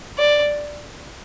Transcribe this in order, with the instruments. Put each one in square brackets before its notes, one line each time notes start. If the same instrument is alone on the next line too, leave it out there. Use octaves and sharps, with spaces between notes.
[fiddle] D5